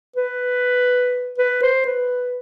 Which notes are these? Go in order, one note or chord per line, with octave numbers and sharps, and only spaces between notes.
B4
B4
C5
B4